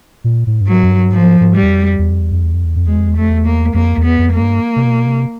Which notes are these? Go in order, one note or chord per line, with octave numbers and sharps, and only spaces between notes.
A#2
A2
G2
G#2 F#3
F#2
G2
G#2 F3
G#2
G3
E2
F2
E2
F2
E2
F2
E2
F2
E2
F2
E2 G#3
F2
E2
F2 A3
E2
A#3
F2 A#3
E2
B3
F2
A#3
G2
C3
B2
C3